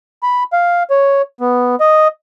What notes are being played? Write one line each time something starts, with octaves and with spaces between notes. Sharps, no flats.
B5
F5
C#5
B3
D#5